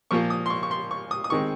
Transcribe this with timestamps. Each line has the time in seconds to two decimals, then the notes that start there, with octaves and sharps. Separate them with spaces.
0.11 A#2 F3 A#3 F4 C#6
0.30 D#6
0.46 C6
0.50 C#6
0.63 C#6
0.71 C6
0.91 C#6
1.11 D#6
1.24 D#6
1.30 D#3 G#3 C4 C#6